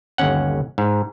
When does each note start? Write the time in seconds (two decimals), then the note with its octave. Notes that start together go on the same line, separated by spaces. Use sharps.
0.18 G1 D#2 C#4 F#5
0.78 G#2